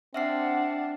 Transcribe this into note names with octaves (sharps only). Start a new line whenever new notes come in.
C4 D4 E5 F#5 F6 C7